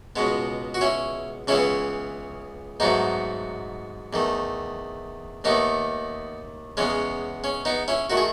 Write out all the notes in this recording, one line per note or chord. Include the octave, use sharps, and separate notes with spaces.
C#2 B2 G#3 B3
F#4
C#4 E4
C#2 C#3 E3 B3 C#4 E4
G#2 F#3 A3 B3 D#4
E2 D#3 A3
D#2 D#3 A3 B3 D#4
E2 C#3 G#3 B3 C#4
C#4
B3 D#4
C#4 E4
D#3 A3 F#4
G#4